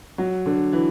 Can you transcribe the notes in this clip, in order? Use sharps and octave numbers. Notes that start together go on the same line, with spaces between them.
F#3
D3
E3